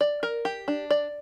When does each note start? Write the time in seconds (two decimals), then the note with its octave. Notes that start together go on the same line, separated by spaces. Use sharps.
0.01 D5
0.23 A#4
0.45 G4
0.68 D4
0.91 D5